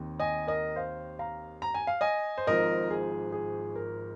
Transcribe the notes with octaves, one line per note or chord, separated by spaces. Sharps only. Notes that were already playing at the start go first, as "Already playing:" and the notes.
Already playing: D#2 D#3 C4 D#4
D#5 G#5
A#4 D#5
C5 F5
F5 A#5
A#5
G#5
F5
D#5 G#5
C5
G#1 G#2 F3 A#4 D#5
G#4
G#4
A#4